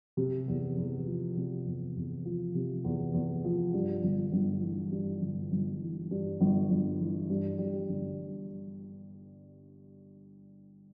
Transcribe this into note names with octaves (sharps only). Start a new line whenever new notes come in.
C3
E2
E2
F3
C3
E2
E2
F3
C3
E2
E2
F3
G2
G1
G1
E3
G2
G1
G1
E3
G2
G1
G1
E3
G2
G3
G1